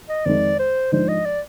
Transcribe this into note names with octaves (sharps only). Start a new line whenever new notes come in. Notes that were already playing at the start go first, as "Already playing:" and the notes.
D#5
F2 D#3 G#3 D5
C5
G#2 F3 G#3 D4 C5
D#5
D5